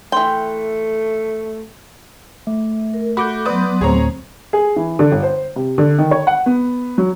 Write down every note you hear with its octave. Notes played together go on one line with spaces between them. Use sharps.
E3 A3 G5 C6
A3
A#4
F#4 A4 B5 D6 G6
F#3 B3 B4 D5 C6 D#6
D2 A2 C4 G#4 C#5 A#5
G#4
E3
D3
G1
C5
C3
D3
D#3
C#5
F#5
B3
F#3